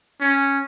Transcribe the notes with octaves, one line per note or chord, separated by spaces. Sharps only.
C#4